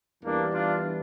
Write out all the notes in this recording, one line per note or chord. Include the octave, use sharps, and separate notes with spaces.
E2 E3 G3 A#3 D4
D4 F4